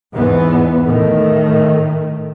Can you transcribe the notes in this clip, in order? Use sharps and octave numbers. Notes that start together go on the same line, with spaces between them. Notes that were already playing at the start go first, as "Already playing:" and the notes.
E2 G#2 E3 B3
A2 D#3 A3